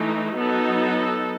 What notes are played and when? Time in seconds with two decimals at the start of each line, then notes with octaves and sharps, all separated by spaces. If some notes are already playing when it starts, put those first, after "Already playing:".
Already playing: E3 A3 D#4
0.37 F#3 B3 D#4 A4